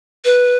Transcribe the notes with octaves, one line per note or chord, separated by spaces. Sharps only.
B4